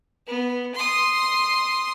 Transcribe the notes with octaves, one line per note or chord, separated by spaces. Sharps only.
B3
C6 D#6